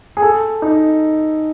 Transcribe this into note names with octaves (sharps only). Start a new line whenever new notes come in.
G#4
A4
D#4